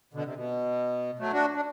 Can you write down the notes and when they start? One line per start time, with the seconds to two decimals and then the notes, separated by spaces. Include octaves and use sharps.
0.14 B2 D3
0.25 C3
0.36 B2
1.19 F#3 A3
1.33 D4 F#4
1.56 D4